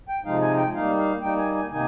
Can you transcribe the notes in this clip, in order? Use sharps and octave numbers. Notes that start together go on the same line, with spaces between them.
G5
C3 F3 G#3 D#4 F5
G#5
G5
G3 A#3 D#4 F5
F5
G3 A#3 D#4 G5
G#5
G#5
C3 D#3 A#3 D#4 G#5